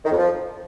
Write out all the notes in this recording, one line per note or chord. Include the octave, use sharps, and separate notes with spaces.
D#3
F2
F3